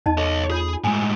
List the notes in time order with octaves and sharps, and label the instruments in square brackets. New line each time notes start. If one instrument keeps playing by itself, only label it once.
[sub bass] E2 [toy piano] D#4 D#5 A5
[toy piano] A4 [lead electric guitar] C#5 D#5
[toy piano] F4 C#5 B5 [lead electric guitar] G#4
[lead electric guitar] A2 G#3 [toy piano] G#5